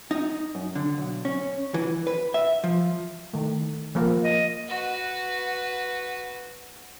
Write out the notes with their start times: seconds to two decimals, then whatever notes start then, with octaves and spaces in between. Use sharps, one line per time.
0.11 D#4
0.55 F#2
0.75 D3
0.98 B1
1.25 C#4
1.74 E3
2.07 B4
2.34 E5
2.64 F3
3.33 D#3 A3
3.95 F3 A#3 A#4
4.24 D#5
4.68 F#4 B4